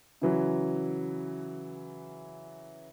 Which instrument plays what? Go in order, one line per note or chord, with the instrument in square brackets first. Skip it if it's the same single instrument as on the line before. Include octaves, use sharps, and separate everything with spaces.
[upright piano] C#3 E3 F#3